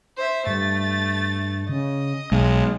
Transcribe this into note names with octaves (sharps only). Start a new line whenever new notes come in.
C5 E5
G2 A3 A6
C#3 D#5
B1 G#3